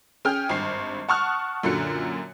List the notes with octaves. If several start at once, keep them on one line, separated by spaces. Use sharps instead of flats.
C#4 G#4 G5 F6 G6
G#1 G2 C7
F#5 A5 C#6 D#6 F6 F#6
F#2 A#2 D3 F#4 F#6 C#7